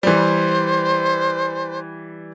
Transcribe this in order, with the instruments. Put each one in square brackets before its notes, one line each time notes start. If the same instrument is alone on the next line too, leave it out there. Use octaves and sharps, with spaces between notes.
[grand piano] E3 G3 [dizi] C5